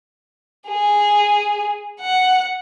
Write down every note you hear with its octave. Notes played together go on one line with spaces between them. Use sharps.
G#4
F#5